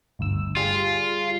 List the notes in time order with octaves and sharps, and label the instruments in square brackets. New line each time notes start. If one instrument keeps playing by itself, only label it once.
[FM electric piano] G1 D2 E6
[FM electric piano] G3 G#4 [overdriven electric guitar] F4